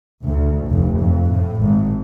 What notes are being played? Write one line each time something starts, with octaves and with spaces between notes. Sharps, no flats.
D2
F1
F2
A2
G#1